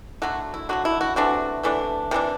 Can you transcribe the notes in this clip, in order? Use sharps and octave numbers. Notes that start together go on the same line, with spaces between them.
D3 F#3 A3 F#4
E4
D3 F#3 A3 F#4
E4
F#4
C3 E3 A3 D4 F#4
C3 E3 A3 D4
C3 E3 G3 D4